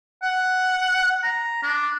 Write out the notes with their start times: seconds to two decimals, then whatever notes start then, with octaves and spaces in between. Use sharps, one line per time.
0.23 F#5
1.23 A#5
1.63 D4